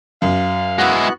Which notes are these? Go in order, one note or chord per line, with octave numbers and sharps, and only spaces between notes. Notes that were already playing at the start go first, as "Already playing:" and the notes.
F#2 F5
G#3 B3 E4 F#4 F#6